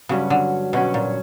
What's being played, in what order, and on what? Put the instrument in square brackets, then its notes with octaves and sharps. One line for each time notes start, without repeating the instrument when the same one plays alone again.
[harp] G2 F#3 C#4 F#4 [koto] C#3
[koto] D3
[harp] G2 F#3 C#4 F#4 [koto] B2
[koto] A#2